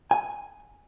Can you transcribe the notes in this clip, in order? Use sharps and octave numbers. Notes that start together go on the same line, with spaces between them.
G#5